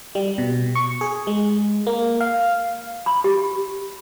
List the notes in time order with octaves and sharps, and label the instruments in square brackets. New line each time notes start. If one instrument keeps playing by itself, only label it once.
[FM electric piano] G3
B2
C#6
G#4
G#3
A#3
F5
[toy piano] B5
G4